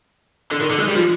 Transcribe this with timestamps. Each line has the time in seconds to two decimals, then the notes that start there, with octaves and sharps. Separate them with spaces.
0.52 D3
0.61 D#3
0.70 D3
0.79 G#3
0.88 G3
0.96 F3